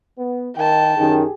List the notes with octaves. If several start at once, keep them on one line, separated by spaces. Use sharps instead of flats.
B3
D#3 G5 A5
F#2 D#3 G4 G#4